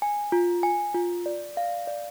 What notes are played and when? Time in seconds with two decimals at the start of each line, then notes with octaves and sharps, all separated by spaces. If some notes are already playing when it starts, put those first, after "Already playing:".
0.02 G#5
0.32 F4
0.63 G#5
0.94 F4
1.26 D5
1.57 F5
1.87 D5